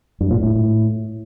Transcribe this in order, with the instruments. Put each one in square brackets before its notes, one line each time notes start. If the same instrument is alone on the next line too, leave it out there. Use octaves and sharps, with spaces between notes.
[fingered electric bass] G2
A#2
A2